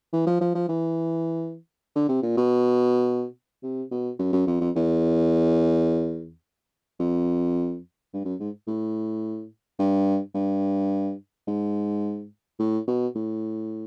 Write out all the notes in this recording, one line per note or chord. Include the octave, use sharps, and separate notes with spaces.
E3
F3
F3
F3
E3
D3
C3
A#2
B2
C3
B2
F#2
F#2
F2
F2
E2
F2
G2
F#2
G#2
A2
G2
G2
G#2
A2
B2
A2